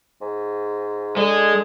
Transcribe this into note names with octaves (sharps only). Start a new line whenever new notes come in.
G#2
D3 G#3